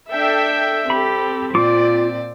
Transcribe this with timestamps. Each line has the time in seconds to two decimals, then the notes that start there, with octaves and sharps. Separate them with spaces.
0.11 D4 A4 E5 G5
0.90 C4 G4 A4 B5
1.55 A#2 F4 D5 D6